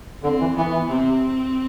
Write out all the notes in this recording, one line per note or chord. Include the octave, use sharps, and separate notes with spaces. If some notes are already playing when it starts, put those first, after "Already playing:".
D3 C4
E3
E3 B3
E3
C3 C4